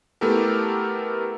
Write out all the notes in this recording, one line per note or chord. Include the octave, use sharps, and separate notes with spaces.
A3 B3 E4 G4 A4 A#4